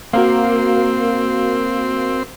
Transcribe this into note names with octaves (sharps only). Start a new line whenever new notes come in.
A#3 C4 F#4 A#4 F5